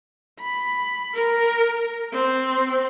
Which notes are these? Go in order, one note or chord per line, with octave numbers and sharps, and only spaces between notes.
B5
A#4
C4